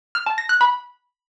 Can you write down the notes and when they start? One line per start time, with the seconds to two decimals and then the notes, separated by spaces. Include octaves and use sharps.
0.15 F6
0.26 A5
0.38 A#6
0.49 F#6
0.61 B5